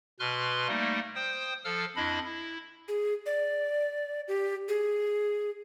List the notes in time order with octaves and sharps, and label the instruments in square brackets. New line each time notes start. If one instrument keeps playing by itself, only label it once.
[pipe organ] B2 B4 C6 F6 F#6
G3 A3 A#3 D#4
C5 G5 D#6
F3 A4 F5 E6 F6
F2 D4 E4 D#5 B5
E4
[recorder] G#4
D5
G4
G#4